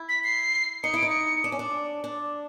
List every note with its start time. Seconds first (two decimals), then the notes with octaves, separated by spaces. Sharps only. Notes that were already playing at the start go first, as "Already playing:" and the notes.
Already playing: E4
0.09 B6
0.24 C7
0.83 D#4 C#7
0.94 E4 D7
1.02 D#4
1.09 C#7
1.44 D4
1.52 C#4
1.59 D4
2.04 D4